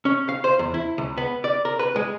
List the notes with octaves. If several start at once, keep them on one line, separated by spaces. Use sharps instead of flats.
C#4
F5
C5
E2
E4
C#2
B3
D5
A#4
B4
G#3